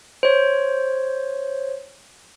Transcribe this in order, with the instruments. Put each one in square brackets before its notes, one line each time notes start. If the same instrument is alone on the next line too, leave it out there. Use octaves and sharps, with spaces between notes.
[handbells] C5 C#5